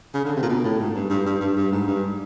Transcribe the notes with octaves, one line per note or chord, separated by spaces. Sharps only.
C#3
D3
C3
A#2
B2
A2
G#2
G2
G2
G2
G2
G2
G#2
G2